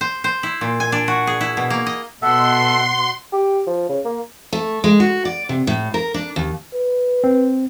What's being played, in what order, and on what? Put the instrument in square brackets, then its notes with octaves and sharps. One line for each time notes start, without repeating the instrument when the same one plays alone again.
[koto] C5
C5
E4
A#2
G#5
D4
F#4
G#4
E4
B2
A#3
D#5
[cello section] B2 [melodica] A4 E5 [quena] F#5 [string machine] C6
[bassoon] G4
F3
C#3
A#3
[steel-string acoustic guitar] A3
G#3
F#4
D5
C3
A2
A#4
D4
D#2
[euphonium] B4
[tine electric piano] C4